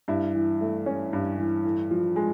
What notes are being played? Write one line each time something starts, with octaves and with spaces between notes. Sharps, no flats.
G2 E4
E3
A3
C#4
G2
E3
A2
F3
G#3